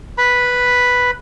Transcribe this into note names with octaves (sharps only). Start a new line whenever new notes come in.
B4 B5